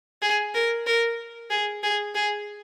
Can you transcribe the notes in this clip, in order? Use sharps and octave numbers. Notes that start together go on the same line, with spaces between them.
G#4
A#4
A#4
G#4
G#4
G#4